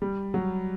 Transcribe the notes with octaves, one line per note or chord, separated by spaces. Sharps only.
G3
F#3